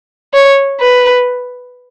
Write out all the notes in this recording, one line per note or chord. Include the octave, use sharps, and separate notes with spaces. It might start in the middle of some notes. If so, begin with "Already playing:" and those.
C#5
B4